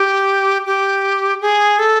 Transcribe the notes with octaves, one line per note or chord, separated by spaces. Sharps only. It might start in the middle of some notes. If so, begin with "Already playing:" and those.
Already playing: G4
G4
G#4
A4